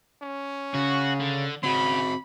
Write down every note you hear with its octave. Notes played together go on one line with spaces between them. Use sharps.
C#4
C#3 F#4
D3
C#3 C4 F#4 B5